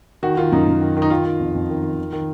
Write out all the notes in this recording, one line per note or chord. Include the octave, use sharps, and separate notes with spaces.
D#3 F#4
D#3 F4
F#2 D#4
F#2
D#3
D#3
D#4
D#3 F4
D#3
F2
F2
D#3
D#3
D#3
D#3